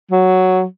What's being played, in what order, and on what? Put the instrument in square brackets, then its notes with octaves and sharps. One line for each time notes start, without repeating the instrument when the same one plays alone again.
[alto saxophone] F#3